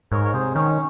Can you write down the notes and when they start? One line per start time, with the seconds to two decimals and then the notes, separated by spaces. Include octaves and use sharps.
0.12 G#2 A#4 C#5
0.25 C#5
0.34 C3 G#4 C5
0.55 D#3 C#4